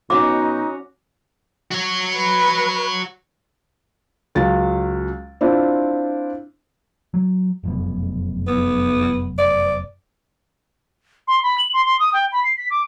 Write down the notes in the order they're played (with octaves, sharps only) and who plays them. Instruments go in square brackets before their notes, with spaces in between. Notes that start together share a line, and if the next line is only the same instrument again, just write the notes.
[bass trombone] B2 [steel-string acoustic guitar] C#4 F#4 [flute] D#4 [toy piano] D6
[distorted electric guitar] F#4 C#5
[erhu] B4
[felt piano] C#2 F#3 A6
C4 D4 E4 F4
[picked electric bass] F#3
F1 F#2 B2
[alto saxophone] B3
D5
[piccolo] C6
B5
F#7
C6
C6
D#6
G5
B5
C7
B6
D6